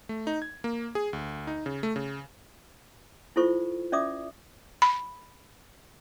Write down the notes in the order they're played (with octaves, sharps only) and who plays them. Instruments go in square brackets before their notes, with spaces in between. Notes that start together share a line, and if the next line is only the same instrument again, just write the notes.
[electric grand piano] A3
D#4
G#6
A#3
G#4
D2
D#4
C#3
A3
C#3
[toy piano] E4 F4 A4 C5 C#6
C#4 D5 E5 D6 D#6
[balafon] B5